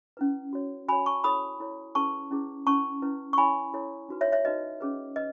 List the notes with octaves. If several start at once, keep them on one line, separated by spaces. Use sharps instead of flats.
C#4 E4 B4
F#4 C#5
F#4 C#5 G#5 B5
A5 C#6
E4 A4 C#5 B5 D#6
E4 A4 C#5
C#4 E4 G#4 B4 A5 C#6
C#4 E4 G#4 B4
C#4 E4 B4 A5 C#6
C#4 E4 B4
C#6
E4 A4 C#5 G#5 B5
E4 A4 C#5
D#4 F#4 B4
C#5 E5
C#5 E5
D#4 F#4 B4 D#5
C#4 G#4 B4
B4 D#5